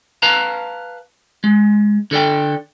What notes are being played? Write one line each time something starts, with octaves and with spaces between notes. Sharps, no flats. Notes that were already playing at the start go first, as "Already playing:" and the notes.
B4 F5 A5 A#5
G#3
D3 A4 D5 G5